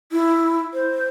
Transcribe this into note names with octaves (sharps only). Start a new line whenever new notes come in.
E4
C5